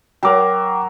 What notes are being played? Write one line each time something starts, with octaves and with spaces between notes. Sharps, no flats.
F#3 A#4 G5 D6